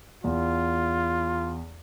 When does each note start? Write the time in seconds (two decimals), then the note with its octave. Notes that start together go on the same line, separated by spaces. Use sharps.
0.24 E2 F4